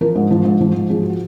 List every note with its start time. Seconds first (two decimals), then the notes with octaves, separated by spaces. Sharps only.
0.01 F3 A#4
0.15 G#2
0.31 F3
0.45 G#2
0.61 F3
0.75 G#2
0.90 F3 G#4
1.03 F#4